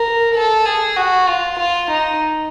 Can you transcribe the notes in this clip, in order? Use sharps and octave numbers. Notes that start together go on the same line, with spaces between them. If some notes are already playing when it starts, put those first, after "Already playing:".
Already playing: A#4
A4
G#4
F#4
F4
F4
D#4